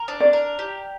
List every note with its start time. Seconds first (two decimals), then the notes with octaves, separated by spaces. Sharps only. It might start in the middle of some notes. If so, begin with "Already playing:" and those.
Already playing: A#4
0.08 D4
0.20 D5
0.33 A#4
0.59 G4